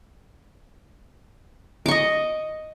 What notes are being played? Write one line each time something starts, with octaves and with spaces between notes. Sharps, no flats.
D#5 C#6 D6